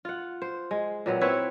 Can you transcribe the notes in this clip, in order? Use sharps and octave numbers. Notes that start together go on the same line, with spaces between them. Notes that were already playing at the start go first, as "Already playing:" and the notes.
F4 F#5
C5
G#3
A#2 F#3 B3 C4
C4 E4 B4 C#5